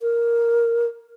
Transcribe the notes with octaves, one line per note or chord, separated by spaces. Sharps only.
A#4